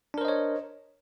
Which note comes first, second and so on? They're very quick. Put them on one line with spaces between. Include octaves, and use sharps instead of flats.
D4 A#4 C5 D#5 C#5